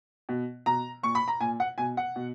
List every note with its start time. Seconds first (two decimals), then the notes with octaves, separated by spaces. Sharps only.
0.29 B2
0.66 B2 A#5
1.03 A#2 C#6
1.15 B5
1.28 A#5
1.40 A#2 G#5
1.60 F#5
1.78 B2 G#5
1.97 F#5
2.16 B2